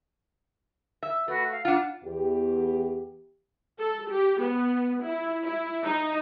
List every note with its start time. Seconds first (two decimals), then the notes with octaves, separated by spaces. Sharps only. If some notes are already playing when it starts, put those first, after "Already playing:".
1.03 E5
1.28 A3 F#4 B4
1.49 F5
1.65 D4 F4 F#5 F6
2.04 E2 G4
3.79 A4
4.10 G4
4.41 B3
5.03 E4
5.45 E4
5.85 D#4